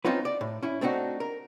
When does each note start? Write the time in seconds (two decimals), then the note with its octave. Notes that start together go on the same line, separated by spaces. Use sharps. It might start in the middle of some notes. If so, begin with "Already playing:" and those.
0.05 C4 C#4 D#4 F4 B4
0.25 D5
0.41 A2
0.62 C#4 E4
0.81 A3 C4 D4 D#4 F#4
1.20 A#4